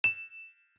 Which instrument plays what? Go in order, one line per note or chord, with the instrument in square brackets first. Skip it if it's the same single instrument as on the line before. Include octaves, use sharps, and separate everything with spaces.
[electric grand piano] E7